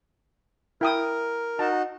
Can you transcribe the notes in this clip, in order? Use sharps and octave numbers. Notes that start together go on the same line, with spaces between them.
E4 A#4 G5 D#6
D#4 F#4 A5